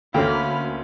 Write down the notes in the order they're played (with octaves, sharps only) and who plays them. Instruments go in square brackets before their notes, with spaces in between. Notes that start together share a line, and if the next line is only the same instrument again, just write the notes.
[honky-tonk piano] D2 C#4 [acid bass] A#3 [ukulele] A4 G5 [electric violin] B5 F6